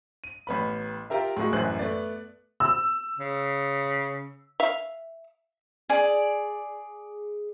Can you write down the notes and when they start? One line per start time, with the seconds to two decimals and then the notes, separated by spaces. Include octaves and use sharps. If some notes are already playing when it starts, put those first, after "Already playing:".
0.24 D#7
0.47 A1 B3 B5
1.10 F4 G4 A#4 E5
1.37 A2 G#3 A#3 F#4
1.52 A1 F#2 E3 C5 F#6 F#7
1.79 A3 B3 D5
2.60 E6
3.19 C#3
4.60 E5 F5
5.90 G#4 D5